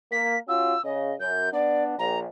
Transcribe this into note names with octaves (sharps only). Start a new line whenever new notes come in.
A#3 B6
C#4 F4 F#4 E6
C#3 D#5
F#2 G6
B3 D4 D5
A#1 A#5